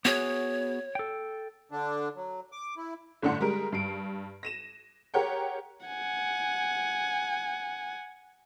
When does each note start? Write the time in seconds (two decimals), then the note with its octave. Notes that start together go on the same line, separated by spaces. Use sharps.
0.05 B3 F#4 G#4 C#5
0.95 A4 G5
1.72 D3 D4
2.16 F#3
2.52 D6
2.77 E4
3.22 G1 A2 D3 D4 F#5 C6
3.41 G3 G#3 A#4 D7
3.72 G2 C7 D7
4.43 A#6 D#7 E7
5.14 G4 G#4 A#4 C#5 F#5 G5
5.86 F#5 G#5